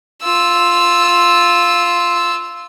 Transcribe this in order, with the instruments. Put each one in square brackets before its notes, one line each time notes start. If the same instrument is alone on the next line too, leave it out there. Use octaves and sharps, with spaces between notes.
[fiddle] F4 E6